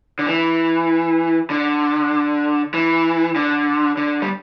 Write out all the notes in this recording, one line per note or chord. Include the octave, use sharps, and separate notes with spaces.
D3
E3
D3
E3
D3
D3
G3